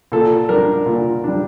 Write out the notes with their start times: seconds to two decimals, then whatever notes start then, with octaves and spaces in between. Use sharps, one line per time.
0.12 A#2 A4
0.49 G3 D4 A#4
0.86 A#2
1.24 G3 D4